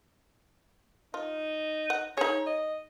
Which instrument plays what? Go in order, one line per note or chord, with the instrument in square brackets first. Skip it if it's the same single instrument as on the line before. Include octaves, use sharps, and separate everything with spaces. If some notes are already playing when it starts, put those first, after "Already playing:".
[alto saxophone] D#4 [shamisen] F4
[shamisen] F#5
[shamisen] D#4 G#4 [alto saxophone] C#5
[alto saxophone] D#5